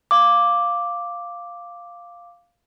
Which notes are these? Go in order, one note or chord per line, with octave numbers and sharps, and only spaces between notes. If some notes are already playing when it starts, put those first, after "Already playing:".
F5 D6